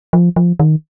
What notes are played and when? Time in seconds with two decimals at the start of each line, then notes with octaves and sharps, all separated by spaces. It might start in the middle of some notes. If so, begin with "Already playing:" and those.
0.13 F3
0.36 F3
0.60 D#3